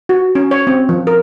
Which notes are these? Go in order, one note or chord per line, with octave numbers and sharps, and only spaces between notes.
F#4
C#4
C#5
C4
F3
A#4